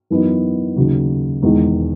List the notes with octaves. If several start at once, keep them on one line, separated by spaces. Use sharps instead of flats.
F#2 E3 B3 D#4
D#2 C#3 F#3
E1 E2 D#3 G#3 D#4